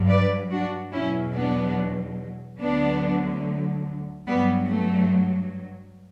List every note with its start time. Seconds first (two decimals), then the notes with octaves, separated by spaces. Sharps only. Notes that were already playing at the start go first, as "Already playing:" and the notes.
Already playing: G2 F#3
0.09 B4 D5
0.51 D4 F#4
0.93 E2 B2 F#3 C#4 E4
1.35 B3 D4
2.60 D2 D3 F#3 B3 D4
4.27 G2 F#3 G3 B3
4.69 A3